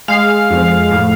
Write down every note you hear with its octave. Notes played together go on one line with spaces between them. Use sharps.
G#3 F5
F2
A2